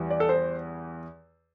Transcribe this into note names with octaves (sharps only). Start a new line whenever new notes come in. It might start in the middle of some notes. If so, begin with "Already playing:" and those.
Already playing: E2 E3 G3
D5
A4
C5